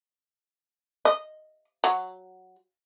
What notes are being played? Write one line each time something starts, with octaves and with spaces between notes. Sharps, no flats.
D#5
F#3